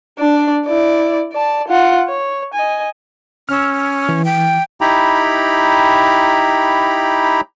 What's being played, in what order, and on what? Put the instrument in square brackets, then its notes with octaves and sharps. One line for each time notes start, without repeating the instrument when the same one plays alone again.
[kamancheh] D4 D5
E4 D5
D5 A5
F4 F#5
C#5
D#5 G#5
[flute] C#4 [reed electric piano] E6 F6
[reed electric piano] E3
[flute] G5
[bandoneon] D#4 E4 G4 G5 A#5 B5